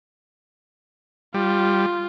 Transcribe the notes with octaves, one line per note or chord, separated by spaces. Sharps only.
G3 F4